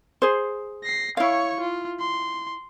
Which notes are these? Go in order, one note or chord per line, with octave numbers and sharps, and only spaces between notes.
G#4 C5
A#6 C7
E4 C#5 F5 C#6
F4
C6